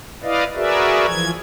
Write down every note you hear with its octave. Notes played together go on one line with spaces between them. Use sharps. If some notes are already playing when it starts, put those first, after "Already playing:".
E4 B4 D5 D#5 F5
F#4 G#4 A#4 B4 D5 E5
E3 F3 G#6